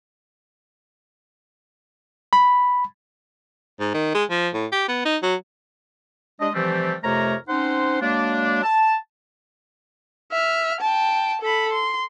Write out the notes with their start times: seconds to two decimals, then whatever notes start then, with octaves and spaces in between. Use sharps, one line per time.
2.33 B5
3.80 G#2
3.94 D#3
4.14 G#3
4.30 F3
4.54 A2
4.72 G4
4.88 B3
5.05 D#4
5.22 F#3
6.40 G3 G#3 D4 D#5
6.54 C3 E3 F3 G3 A3 C4
7.03 F2 C3 A3 A#4 C#5 A#5
7.48 C4 C#4 D#4 C5 F#5 C6
8.01 F#3 G#3 A#3 D4
8.63 A5
10.32 E5 F6
10.81 G5 A5
11.41 A4 B5
11.72 C6